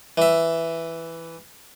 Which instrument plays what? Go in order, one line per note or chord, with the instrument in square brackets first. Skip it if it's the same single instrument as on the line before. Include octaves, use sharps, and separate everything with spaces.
[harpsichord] E3 E5